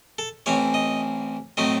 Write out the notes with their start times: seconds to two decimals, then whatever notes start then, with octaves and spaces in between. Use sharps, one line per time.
0.18 A4
0.46 A1 A2 E3 C4 C#5
0.74 D#5
1.57 A2 F#3 A3 C4 D#5